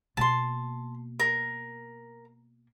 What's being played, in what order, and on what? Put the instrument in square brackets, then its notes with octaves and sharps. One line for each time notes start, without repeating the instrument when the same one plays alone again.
[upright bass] B2 A#3 [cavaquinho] A5 C6
[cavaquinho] A#4